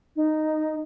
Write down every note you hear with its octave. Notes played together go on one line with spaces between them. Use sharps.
D#4